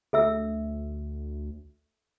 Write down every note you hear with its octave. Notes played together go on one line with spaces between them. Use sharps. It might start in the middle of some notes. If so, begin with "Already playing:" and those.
D2 A4 E5 E6